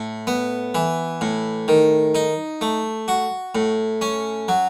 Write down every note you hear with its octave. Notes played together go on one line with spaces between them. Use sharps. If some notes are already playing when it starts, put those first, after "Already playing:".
Already playing: A2
B3
E3
A2
D#3
D#4
A3
F#4
A2
C#4
F#3